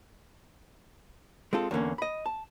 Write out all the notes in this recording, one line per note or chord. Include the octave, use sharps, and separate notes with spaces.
G#3 C4 F4 A4
E2 D3 A#3 C#4
D#5 B5
A5